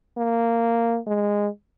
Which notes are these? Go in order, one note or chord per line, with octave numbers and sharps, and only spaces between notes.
A#3
G#3